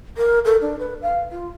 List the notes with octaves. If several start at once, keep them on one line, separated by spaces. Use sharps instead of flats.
A#4
A4
D4
B4
F5
F4